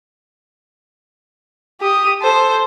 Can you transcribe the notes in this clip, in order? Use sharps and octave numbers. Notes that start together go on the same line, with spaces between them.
G4 D#6
A4 C5